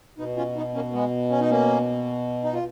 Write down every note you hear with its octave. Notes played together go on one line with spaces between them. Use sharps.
B2 B3 D#4
C#4 F4
B3 D#4
A#3 C#4
G#3 B3
C#4
D#4
A#3 C#4
D#4
F4